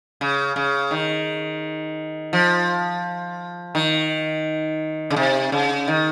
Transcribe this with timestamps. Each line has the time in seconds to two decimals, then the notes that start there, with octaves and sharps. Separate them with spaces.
0.21 C#3
0.56 C#3
0.91 D#3
2.33 F3
3.75 D#3
5.10 C#3
5.16 C3
5.52 C#3
5.88 D#3